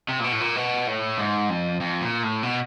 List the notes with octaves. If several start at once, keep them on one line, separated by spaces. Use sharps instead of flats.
C3
A#2
B2
A2
A#2
B2
A2
G#2
F2
F2
A#2
A2
B2